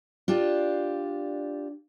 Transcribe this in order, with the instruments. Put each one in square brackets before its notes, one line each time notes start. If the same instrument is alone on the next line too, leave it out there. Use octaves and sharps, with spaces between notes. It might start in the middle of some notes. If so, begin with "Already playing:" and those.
[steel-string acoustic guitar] D4 F4 G4